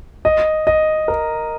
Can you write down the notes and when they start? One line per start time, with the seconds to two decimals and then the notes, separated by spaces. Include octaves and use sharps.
0.25 D#5
0.67 D#5
1.08 A#4